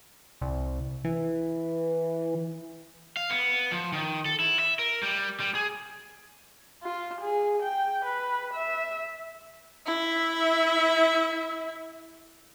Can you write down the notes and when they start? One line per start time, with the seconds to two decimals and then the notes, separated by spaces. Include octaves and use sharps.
0.42 C2
1.04 E3
3.17 F5
3.30 B3
3.72 F3
3.93 D#3
4.25 A4
4.40 E4
4.59 E5
4.79 A#4
5.03 G3
5.40 G3
5.55 G#4
6.83 F4
7.21 G#4
7.63 G5
8.05 B4
8.54 E5
9.86 E4 E5